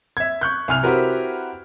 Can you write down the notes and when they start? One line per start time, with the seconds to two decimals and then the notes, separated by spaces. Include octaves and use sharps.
0.17 E5 G#6
0.41 C#6 F#6 G6
0.68 C2 G#5 F6 F7
0.83 C4 E4 F#4 G4 A#4 B4